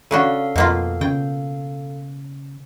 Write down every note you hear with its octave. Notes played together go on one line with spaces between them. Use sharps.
C#3 D4 F#4 A4 F5
F2 B2 A#3 F4
C#3 G5